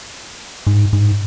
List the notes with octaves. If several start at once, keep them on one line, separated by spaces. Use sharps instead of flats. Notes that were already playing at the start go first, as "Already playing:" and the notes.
G#2
G#2